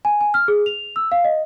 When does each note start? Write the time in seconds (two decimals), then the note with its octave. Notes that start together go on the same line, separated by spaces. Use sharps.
0.05 G#5
0.21 G#5
0.34 F6
0.48 G#4
0.66 F7
0.96 E6
1.12 F5
1.24 D#5